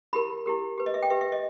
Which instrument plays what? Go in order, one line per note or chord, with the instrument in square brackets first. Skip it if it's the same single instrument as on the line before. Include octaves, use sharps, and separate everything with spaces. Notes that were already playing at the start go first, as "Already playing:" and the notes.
[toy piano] E4 G4 A#4 B5
E4 G4 A#4
G4 B4
D#5
E5
G5
G4 B4 E5
E5
D#5